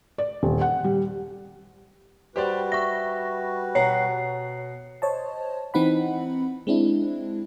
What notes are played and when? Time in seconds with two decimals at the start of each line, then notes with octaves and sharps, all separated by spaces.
0.18 D5
0.43 D#1
0.61 F#5
0.84 G3
2.36 G3 F#4 G4 B4 C5 D5
2.72 E5 C#6 A#6
3.75 B2 C#5 F#5 A#5 C7
5.02 C5 C#5 D#5 A5
5.74 E3 C4 D#4 F#5 B5
6.67 G#3 C4 D4 E4